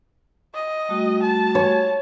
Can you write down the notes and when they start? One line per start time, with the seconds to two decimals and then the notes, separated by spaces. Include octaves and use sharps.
0.54 D#5
0.89 G3 A3 F#4
1.22 A5
1.55 C#5